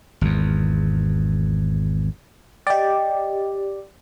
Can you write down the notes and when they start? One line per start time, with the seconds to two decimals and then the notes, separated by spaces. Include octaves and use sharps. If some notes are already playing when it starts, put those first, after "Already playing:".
0.21 G#1 E2
2.67 G4 D5 D#5 G5